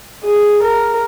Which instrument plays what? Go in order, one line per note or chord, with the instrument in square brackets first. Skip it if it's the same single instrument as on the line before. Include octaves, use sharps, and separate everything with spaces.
[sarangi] G#4
A#4